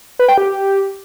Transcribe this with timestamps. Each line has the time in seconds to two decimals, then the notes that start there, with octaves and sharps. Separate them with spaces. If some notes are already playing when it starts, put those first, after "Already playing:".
0.19 B4
0.28 G5
0.38 G4